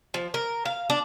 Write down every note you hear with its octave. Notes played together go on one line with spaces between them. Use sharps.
F3
A#4
F5
D4